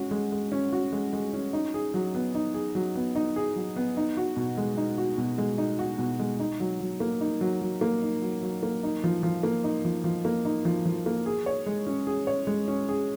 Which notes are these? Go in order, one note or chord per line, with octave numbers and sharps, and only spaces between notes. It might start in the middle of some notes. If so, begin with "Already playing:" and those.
Already playing: G#3 C#4 F#4
G#3
G#3
C#4
F#4
G#3
G#3
C#4
D#4
G#4
F#3
B3
D#4
G#4
F#3
B3
D#4
G#4
F#3
B3
D#4
F#4
B2
G#3
D#4
F#4
B2
G#3
D#4
F#4
B2
G#3
D#4
F#3
F#3
A#3
D#4
F#3
F#3
A#3
D#4
F#3
F#3
A#3
D#4
F3
F3
A#3
D#4
F3
F3
A#3
D#4
F3
F3
A#3
G#4
C#5
G#3
C#4
G#4
C#5
G#3
C#4
G#4